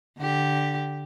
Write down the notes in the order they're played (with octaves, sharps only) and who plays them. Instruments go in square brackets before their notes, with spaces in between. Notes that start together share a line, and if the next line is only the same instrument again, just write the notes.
[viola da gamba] D3 G4